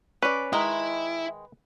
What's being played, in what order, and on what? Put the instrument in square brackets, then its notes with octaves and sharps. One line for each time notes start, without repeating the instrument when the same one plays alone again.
[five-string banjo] C#4 D5 [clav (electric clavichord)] B4
[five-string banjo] D#3 G#3 [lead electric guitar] E4